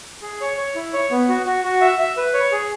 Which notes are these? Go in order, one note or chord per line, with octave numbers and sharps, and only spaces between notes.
G#4
C#5
C#5
E4
C#5
B3
F#4
F#4
F#4
E5
E5
B4
C#5
G#4